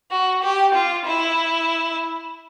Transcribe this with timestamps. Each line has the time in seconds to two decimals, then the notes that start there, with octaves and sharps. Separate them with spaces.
0.11 F#4
0.42 G4
0.74 F4
1.05 E4